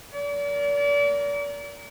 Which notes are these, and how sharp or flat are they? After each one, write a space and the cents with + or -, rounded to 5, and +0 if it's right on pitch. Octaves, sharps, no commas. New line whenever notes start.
A#4 +0 D5 -35